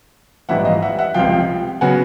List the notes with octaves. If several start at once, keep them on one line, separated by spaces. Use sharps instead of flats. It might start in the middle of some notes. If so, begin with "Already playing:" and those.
A#1 G#2 E3 G3 E5 F#5
D#5 F5
E5 F#5
E5 F#5
C#2 C3 F3 F5 G5
C#3 F#3 B3 F#5 G#5